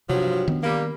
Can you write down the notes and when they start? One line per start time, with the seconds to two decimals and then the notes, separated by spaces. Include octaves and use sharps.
0.09 G2 C3 F3 F#3
0.48 D#3 B3 D4
0.63 G3 A#3